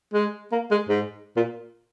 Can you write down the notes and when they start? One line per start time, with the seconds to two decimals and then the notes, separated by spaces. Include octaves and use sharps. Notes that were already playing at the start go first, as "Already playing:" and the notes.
0.13 G#3
0.52 A#3
0.71 G#3
0.89 G#2
1.36 A#2